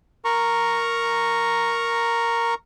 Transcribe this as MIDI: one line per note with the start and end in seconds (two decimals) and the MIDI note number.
0.25 2.54 70
0.25 2.54 82
0.25 2.54 85